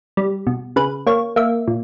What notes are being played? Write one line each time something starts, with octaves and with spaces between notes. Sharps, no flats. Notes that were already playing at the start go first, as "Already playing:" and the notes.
G3
B2
C#3 B4
A#3 C#5
A#3 E5
A#2